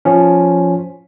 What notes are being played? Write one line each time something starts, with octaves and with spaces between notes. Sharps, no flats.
F3 C#4